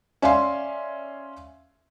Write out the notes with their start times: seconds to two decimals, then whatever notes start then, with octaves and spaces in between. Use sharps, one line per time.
0.22 C#4 D5 E5 F5 G#5 C6